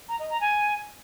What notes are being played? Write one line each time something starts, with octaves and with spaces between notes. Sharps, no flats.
A#5
D#5
A#5
G#5